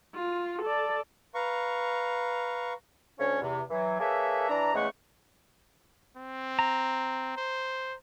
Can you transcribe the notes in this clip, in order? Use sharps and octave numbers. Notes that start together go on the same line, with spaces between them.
F4
A4 D5
B4 F5 A#5 C#6
D2 C#4 C#5
E2 C3
E3 F#3
A#3 G#4 A4 B4 C#5 E5
E3 D4 D5 A#5
E2 C#3 G#3 A3 F#5 C#6
C4
A#5
C5